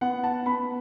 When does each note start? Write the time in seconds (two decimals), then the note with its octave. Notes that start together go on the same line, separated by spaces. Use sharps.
0.01 B3 F#5
0.24 A5
0.46 B3 B5